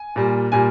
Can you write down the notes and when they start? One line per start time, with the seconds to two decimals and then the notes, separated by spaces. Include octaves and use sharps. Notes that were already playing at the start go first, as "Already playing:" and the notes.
Already playing: G#5
0.16 A#2 G3
0.52 A#2 G3 G#5